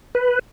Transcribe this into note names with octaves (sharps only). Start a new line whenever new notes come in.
B4